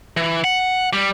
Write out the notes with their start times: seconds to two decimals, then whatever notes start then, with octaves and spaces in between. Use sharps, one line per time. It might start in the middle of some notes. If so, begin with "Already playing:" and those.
0.17 E3
0.44 F#5
0.93 G3